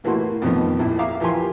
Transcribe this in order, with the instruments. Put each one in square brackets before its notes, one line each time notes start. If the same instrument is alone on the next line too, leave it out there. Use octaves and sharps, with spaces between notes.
[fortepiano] A2 E3 A3 A#3 F#4 C6
F2 B2 D#3 F3 A3 B3
A#1 A#2 E4
E5 F5 A#5 D6
E3 F3 G4 A#4 G#5 C6